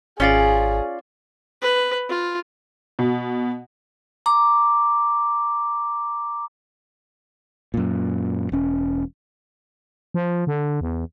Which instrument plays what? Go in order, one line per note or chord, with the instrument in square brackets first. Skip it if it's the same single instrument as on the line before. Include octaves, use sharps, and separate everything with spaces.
[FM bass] G#1 [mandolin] C#4 F4 D5 [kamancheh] G#4
[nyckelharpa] B4
F4
[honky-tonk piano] B2
[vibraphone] A#5 D6
[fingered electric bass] F#2 A#2
E1 C#4
[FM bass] F3
D3
E2